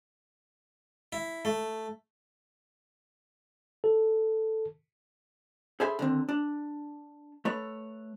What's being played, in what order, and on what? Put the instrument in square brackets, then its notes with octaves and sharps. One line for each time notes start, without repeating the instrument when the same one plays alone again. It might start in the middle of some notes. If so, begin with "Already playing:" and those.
[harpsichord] E4
A3
[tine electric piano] A4
[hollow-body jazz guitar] G#4 A4 C5 E5 G#5 B5
D3 D#3 C4
D4
A3 B4 C#5